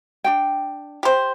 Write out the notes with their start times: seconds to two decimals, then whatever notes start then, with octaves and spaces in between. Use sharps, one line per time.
0.24 D4 F#4 G5
1.03 G4 C5